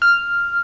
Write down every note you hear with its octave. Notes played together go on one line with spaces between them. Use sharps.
F6